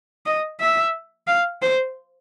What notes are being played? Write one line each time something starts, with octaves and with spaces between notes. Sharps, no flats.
D#5
E5
F5
C5